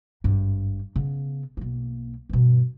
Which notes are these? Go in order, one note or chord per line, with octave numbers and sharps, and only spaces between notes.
G#1 G2
C#3 B3
B1 A#3
G2 B2